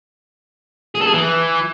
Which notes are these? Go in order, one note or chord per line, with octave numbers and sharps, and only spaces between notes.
G#4
A4
G#4
E3